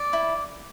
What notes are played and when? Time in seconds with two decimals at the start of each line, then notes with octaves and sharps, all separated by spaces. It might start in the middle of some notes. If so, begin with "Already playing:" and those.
Already playing: D5
0.13 E4